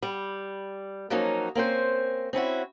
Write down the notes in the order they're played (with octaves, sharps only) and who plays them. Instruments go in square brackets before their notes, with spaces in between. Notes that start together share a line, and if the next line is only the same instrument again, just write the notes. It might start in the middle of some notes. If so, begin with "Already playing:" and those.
[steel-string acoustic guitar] G3
F3 F#3 A#3 C#4 D#4
A#3 C4 C#4 C5
C4 C#4 E4 F#4